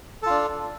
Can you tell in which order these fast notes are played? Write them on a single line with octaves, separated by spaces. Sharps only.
A4 F4 D4